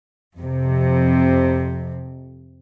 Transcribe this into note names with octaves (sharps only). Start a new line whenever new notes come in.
F2 C3